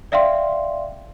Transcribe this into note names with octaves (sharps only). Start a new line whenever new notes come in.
D5 E5 F5 G5 C6